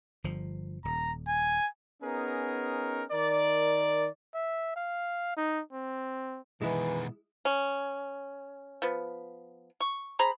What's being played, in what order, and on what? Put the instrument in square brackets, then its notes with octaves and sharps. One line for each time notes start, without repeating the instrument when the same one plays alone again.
[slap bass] G1 F3
[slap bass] D#1 [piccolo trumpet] A#5
[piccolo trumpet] G#5
[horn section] B3 C#4 D#4 G#4 A#4
D#3 A#4 D5
[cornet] E5
F5
D#4
C4
[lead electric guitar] B2 D#3 [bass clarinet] E3 [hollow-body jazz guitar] G#3 E4
[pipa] C#4
F3 B3
C#6
G#4 C5 A#5 B5